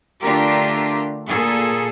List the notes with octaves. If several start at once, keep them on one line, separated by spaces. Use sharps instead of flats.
D3 A3 D4 F4 G4 A#4
A#2 G#4 A4